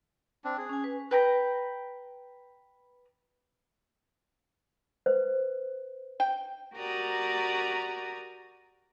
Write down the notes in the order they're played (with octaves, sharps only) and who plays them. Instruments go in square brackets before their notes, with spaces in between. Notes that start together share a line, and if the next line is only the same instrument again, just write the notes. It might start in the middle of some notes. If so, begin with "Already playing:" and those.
[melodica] C4 D4
G#4
[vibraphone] C#4 G#5
B4
[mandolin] B4 G5 A#5
[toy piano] B4 C5
[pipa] G5
[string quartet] F#4 G4 A#4 D5 A#5 D#6